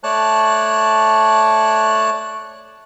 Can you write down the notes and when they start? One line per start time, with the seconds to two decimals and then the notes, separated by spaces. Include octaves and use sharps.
0.04 A3 C#5 D5 A5 F#6